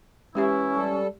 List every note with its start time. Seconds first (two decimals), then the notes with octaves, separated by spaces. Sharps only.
0.35 E3 G#3 C#4 E4 G4 E5
0.76 G3 A4